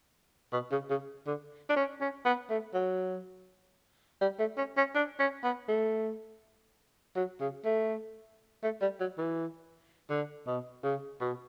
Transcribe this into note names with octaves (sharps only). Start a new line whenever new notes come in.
B2
C#3
C#3
D3
D4
C#4
C#4
B3
A3
F#3
G3
A3
C#4
C#4
D4
C#4
B3
A3
F#3
C#3
A3
A3
G3
F#3
E3
D3
B2
C#3
B2